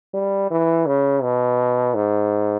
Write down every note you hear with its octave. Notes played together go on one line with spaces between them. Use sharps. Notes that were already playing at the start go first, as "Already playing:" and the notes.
G3
E3
C#3
B2
G#2